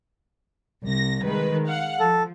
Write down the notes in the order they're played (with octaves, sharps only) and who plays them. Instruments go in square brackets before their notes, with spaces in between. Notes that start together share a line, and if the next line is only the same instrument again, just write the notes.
[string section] C2 A#6
D#3 G#3 B4
F5 F#5
[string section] F3 [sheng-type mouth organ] A4